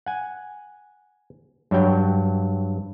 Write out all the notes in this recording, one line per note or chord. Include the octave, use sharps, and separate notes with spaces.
F#5 G#5
G2 F#3 C#5 G5